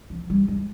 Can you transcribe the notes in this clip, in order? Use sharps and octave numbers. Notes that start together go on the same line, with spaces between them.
F3
G3
G#3